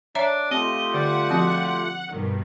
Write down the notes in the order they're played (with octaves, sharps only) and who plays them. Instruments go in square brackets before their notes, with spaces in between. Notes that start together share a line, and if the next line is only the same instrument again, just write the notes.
[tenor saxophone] D4 [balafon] C#5 E5 A#5
[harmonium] A3 F4 G4 [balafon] C4 [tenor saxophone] D#5
[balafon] D3 [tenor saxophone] G3 [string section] F#5
[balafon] F3 C4 F#4
[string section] G2 B2 D#3